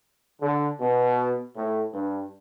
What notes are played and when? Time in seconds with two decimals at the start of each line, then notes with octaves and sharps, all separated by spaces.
0.42 D3
0.80 B2
1.56 A2
1.94 G2